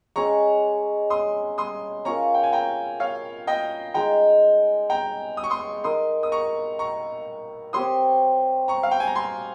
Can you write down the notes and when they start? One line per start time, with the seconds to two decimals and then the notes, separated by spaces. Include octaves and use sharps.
0.16 G#3 C#4 G#4 A#5 C#6
1.10 C6 D#6
1.58 C6 D#6
2.05 C#4 F4 A#4 A#5 C#6
2.34 G5
2.43 G#5
2.53 G5 A#5
3.00 C#5 F5
3.47 D#5 G5
3.94 G#3 D#4 G#4 G5 A#5
4.90 G5 A#5
5.37 D#6
5.44 C#6
5.50 C6 D#6
5.84 D#4 A#4 D#5 C6 D#6
6.23 D#6
6.32 A#5 C#6
6.79 A#5 C#6
7.73 C4 G4 C#5 C6 D#6
8.68 A#5 C#6
8.83 F5
8.91 G5
9.00 G#5
9.07 A#5
9.15 G#5 C6